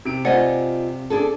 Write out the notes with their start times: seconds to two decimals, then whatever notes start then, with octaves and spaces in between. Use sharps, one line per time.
0.05 C3 D7
0.25 F4 C5 D5 D#5 F#5 G#5
1.10 D4 G#4 A4